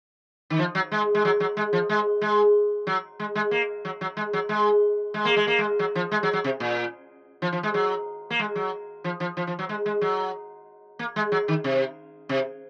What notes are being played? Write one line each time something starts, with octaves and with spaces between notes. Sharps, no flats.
D#3
F3
F#3
G#3
G#3
F#3
F#3
G#3
F3
G#3
G#3
F#3
G#3
G#3
A#3
F#3
F#3
G#3
F#3
G#3
G#3
A#3
G#3
A#3
G#3
F#3
F3
G#3
F#3
F#3
C3
A#2
F3
F3
G#3
F#3
A#3
G#3
F#3
F3
F3
F3
F3
F#3
G#3
G#3
F#3
A#3
G#3
F#3
D#3
C3
C3